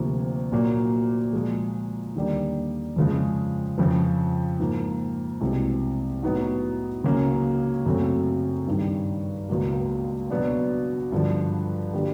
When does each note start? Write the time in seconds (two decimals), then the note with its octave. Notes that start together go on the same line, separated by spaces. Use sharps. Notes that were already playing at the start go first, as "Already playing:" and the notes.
Already playing: D2 C3 F3 A#3
0.52 A#2 F#3 A#3
1.33 A#2 F3 G#3
2.15 D#2 D3 G3 A#3
2.96 F2 C#3 F3 G#3
3.78 F2 C#3 F3
4.60 G#2 F3 A#3
5.41 C2 B2 G#3 C4
6.22 A2 F#3 B3 D#4 F#4
7.04 C#2 C#3 F#3 A#3 C#4
7.86 F#2 C#3 F#3 A3 C4
8.67 G2 D#3 G3
9.49 C#2 B2 F#3 A#3
10.30 B2 F#3 B3 D4
11.12 G2 D3 F3
11.94 D3 F#3 A#3 D4 G4